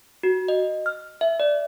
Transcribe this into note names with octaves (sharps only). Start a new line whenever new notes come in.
F#4
D#5
F6
E5
D5